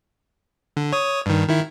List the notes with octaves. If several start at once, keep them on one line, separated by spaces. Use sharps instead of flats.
D3
C#5 D#6
G2 D#3
D#3 E4